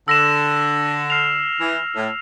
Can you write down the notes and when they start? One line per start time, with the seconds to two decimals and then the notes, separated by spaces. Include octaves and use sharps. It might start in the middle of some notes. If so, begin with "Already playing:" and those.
0.08 D3 E6 A#6 E7
1.10 F6 C7 F7
1.61 E3
1.95 A2